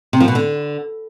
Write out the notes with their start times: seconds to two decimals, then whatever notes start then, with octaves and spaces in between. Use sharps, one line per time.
0.13 C3
0.20 F3
0.28 B2
0.35 D3